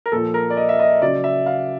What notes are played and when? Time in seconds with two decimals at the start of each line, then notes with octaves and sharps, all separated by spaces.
0.06 A#4
0.12 A#2 F3 A4
0.34 A#4
0.50 D5
0.57 D#5
0.69 E5
0.80 D#5
1.02 C#3 F#3 D5
1.24 E5
1.46 F5